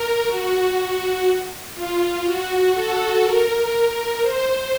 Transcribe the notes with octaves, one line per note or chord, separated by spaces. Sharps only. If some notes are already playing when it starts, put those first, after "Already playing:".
Already playing: A#4
F#4
F4
F#4
A4
A#4
A#4
C5